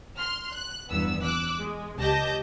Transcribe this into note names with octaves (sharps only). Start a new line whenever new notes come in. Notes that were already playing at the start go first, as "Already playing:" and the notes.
C6 F6
F#6
E2 G2 B3 E6
D6 E6 F#6
G#3
C#2 G4 D#5 A5 G6 A#6